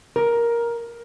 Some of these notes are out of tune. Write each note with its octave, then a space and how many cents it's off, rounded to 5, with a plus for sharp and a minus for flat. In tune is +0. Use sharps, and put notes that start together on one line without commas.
A#4 +10